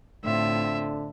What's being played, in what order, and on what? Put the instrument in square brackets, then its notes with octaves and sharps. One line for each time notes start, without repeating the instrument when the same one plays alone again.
[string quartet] A2 C4 F4 [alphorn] D3 [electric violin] E5